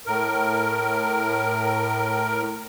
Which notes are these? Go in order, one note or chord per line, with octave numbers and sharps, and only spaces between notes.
A2 A#4